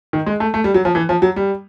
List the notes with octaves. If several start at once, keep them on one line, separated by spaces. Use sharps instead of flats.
D#3
G#3
A3
A3
G3
F#3
F3
E3
F3
F#3
G3